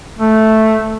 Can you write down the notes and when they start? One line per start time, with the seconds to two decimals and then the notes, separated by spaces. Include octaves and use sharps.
0.19 A3